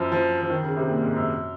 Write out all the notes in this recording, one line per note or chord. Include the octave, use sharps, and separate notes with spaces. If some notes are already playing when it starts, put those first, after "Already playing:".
Already playing: F#2 F3
F3
F3
D#3
C#3
C3
A#2
G#2
F#2